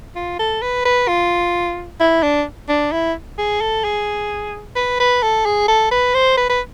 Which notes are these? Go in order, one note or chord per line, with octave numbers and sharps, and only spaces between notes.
F4
A4
B4
B4
F4
E4
D4
D4
E4
G#4
A4
G#4
B4
B4
A4
G#4
A4
B4
C5
B4
B4